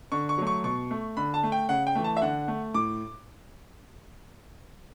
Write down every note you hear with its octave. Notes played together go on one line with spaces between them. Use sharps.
D3 C#6
C#6
F#3 A3
C#6
B2 C#6
A3
D3 B5
A5
A3
G5
C#3 F#5
G5
E3 A3
A5
E5
D3 F#5
A3
A2 D6